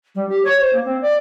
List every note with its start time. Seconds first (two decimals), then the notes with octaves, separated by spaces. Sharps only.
0.15 G3
0.28 G4
0.44 C#5
0.60 C5
0.73 A#3
0.84 C4
1.01 D5